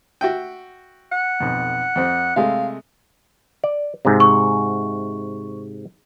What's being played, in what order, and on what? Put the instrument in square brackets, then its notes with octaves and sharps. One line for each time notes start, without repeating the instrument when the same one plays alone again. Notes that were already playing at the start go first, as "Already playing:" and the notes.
[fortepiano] F#4 E5 G5
[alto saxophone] F#5
[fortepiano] B1 F2
F2 C4
[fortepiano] C3 G#3 A3 [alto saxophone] F5
[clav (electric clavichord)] D5
G#2 C3
[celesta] C#6